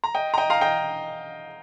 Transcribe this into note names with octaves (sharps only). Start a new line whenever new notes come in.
A#5
D#5 G5
A#5
D#5 G5
F5 A#5
D#5 G5